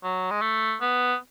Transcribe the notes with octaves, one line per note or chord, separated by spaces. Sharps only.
F#3
G#3
A3
B3